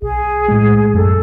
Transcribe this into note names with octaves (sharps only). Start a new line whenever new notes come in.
B1 G#4
A2 G#3
F#2 A4